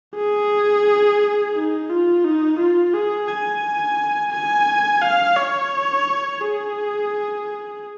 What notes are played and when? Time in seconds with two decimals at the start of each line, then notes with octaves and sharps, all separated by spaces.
0.16 G#4
1.55 D#4
1.89 F4
2.24 D#4
2.59 F4
2.93 G#4
3.28 G#5
4.32 G#5
5.02 F5
5.36 C#5
6.40 G#4